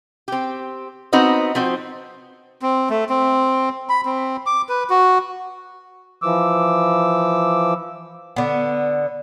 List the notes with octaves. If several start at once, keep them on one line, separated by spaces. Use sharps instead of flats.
C4 G4
B3 C4 D#4 F#4 D#5
F3 C4 F#4 C5
C4
A3
C4
B5
C4
D6
B4
F#4
E3 F3 D6 E6
D3 B3